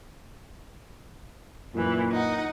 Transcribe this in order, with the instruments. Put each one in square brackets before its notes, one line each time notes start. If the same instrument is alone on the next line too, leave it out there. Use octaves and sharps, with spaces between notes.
[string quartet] F#2 E3 [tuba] A#2
[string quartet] D#4 F#5